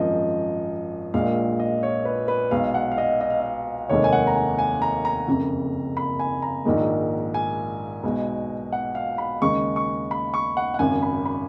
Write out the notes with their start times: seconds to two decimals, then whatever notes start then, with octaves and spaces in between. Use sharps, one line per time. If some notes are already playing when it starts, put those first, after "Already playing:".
Already playing: G#1 F#2 F3 G#3 D#5
1.14 A#1 A#2 G#3 F5
1.60 D#5
1.83 C#5
2.05 B4
2.28 B4
2.51 B1 B2 G#3 F5
2.74 F#5
2.92 F5
2.98 D#5
3.21 D#5
3.30 F5
3.40 D#5
3.89 F1 D#2 D#3 G#3 C#5
4.04 G#5
4.13 F#5
4.27 A#5
4.36 G#5
4.59 G#5
4.82 A#5
5.05 A#5
5.28 F#1 F2 C#3
5.97 B5
6.20 G#5
6.42 A#5
6.65 A#1 G#2 D#3 G#3
7.34 G#5
8.04 B1 B2 G#3
8.72 F#5
8.95 F5
9.18 B5
9.42 D#2 C#3 G#3 C#6
9.76 C#6
10.11 B5
10.34 C#6
10.57 F#5
10.74 F#5
10.79 G#1 F#2 C#3 G#5
11.02 B5
11.25 B5